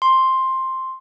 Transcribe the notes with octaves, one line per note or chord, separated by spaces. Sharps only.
C6